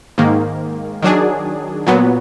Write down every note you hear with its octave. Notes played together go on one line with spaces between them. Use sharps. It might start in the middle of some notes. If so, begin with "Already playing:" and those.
G#2 D#3 A#3
D#3 F#3 D4 G#4
A#2 F#3 B3